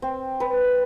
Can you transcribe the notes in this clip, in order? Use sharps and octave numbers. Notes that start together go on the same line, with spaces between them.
C4
B4